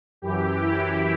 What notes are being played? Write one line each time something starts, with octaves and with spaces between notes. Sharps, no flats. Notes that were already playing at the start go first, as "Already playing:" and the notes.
F#2 E3 G4
E4